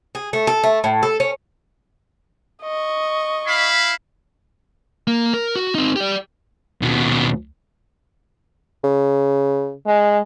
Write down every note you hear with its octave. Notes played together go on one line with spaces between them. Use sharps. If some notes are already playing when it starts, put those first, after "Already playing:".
G#4
A3
A4
A3
A2
A4
C#4
D#5 C#6
E4 F5 B5
A#3
A#4
F#4
C4 D#4
G4 D5
D#2 B2
C#3
G#3